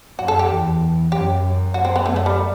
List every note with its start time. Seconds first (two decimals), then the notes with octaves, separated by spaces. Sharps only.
0.19 F#2 F#4
0.28 A4
0.39 G4
0.49 E2
1.12 F#2 G4
1.43 F#2
1.74 F#4
1.85 C4
1.96 B3
2.05 F#2 A3
2.16 A3
2.26 G3